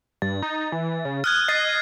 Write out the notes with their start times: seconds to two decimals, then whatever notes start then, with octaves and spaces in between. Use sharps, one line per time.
0.22 G2 A6
0.42 D#4
0.72 E3
1.05 C#3
1.24 D#6 F6 F#6 G#6
1.48 D#5 F#6 A6 C7